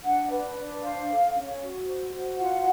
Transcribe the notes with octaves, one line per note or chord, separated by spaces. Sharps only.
D4 F#5
B4
D4
C5 F5
A4
C#4
F#4
C5
F#4
F4 F#5